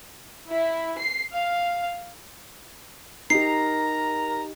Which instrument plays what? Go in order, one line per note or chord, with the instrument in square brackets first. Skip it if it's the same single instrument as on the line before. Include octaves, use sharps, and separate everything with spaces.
[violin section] E4
C7
F5
[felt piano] D#4 G4 [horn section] A#4 A#5 [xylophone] C7